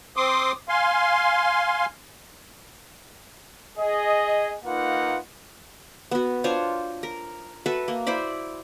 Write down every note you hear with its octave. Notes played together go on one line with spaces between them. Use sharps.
C4 C6 D6 D#6
F5 G#5 C6
G#4 D#5
A#3 D#4 F4 B4 F#5
B3 F#4
D4 F4 C5 C#5
A#4
F#4 A4 B4 E5
A#3
E4 C5 D5 B5